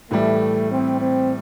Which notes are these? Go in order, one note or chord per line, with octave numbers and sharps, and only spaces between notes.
A2 E3 G3 A3
C4
C4